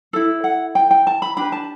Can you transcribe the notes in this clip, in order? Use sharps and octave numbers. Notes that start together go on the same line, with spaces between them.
E4 A4
F#5
G5
G5
A5
B5
D4 G4 B4 B5
A5